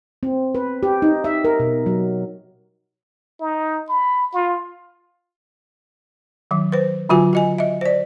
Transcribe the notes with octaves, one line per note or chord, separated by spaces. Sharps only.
C4
B4
G4
D#4
E5
A#4
B2
F#3
D#4
B5
F4
D#3 F#3
B4 C5
D3 F#3 F4 F#4 G#5
F#4 D#5 G#5
D#5 E5
C5 D5